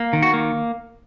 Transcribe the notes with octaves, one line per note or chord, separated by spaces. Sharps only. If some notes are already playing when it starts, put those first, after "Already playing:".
Already playing: A#3
D#3
F#4
A#3